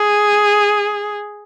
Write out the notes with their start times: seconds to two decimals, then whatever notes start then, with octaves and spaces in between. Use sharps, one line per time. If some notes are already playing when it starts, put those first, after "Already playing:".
Already playing: G#4